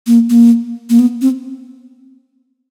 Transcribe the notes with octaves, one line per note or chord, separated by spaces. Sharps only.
A#3
A#3
A#3
B3
C4